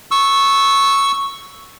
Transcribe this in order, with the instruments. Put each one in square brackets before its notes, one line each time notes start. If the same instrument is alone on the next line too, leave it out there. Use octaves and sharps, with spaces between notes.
[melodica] C#6 E6